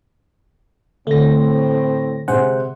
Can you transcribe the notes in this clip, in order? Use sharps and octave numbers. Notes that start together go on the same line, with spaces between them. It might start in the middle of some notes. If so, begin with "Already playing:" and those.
A2 D3 A3 C4 A#6
C3 G#3 C5 F#5 G#5